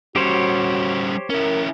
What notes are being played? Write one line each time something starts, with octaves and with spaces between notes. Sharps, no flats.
G3 C#4 F#4 G4 C5 C#5
C#4 E4 A#4